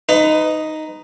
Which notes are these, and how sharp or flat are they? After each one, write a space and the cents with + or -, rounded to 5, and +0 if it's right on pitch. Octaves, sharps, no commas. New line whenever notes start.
D#4 +0 B4 +30